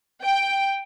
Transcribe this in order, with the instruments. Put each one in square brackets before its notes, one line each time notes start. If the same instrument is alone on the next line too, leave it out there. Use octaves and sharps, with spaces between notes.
[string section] G5